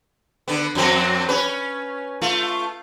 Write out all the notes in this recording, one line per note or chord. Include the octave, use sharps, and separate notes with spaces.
D3 B3
F2 F#3 C4
C#4 B4
A3 F4